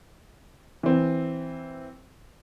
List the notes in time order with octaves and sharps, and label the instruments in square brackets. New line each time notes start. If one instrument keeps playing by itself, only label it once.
[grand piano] E3 C4